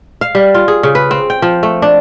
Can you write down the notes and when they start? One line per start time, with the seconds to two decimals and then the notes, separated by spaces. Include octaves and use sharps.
0.21 F5
0.35 G3
0.55 F4
0.68 G#4
0.83 C#3
0.95 B4
1.11 C4
1.30 G5
1.42 F3
1.63 A3
1.82 D4